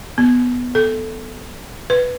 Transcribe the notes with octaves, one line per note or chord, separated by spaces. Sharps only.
B3
A4
B4